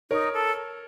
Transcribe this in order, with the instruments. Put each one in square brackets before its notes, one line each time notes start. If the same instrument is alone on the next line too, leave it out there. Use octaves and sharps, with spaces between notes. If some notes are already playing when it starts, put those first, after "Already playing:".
[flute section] D#4 [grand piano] A#4 C#5
[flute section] A4